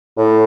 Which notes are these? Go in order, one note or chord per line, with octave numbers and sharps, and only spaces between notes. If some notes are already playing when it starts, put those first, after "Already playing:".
A2